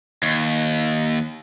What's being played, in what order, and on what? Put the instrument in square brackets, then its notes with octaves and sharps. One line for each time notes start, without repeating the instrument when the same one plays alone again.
[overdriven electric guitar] D#2